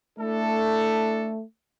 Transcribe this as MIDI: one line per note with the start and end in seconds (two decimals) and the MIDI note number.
0.19 1.43 57
0.19 1.32 62
0.19 1.32 64
0.19 1.32 69